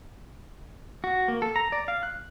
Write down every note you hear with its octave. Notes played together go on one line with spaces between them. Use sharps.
F#4
A#3
A4
A#5
D5
F5
F#6